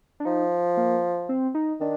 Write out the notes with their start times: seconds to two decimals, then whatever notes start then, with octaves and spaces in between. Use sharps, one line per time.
0.20 D4
0.25 F3 D#4
0.77 A#3
1.29 C4
1.55 D#4
1.80 D#3 D4